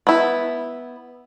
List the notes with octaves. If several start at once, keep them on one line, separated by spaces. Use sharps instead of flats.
B3 E4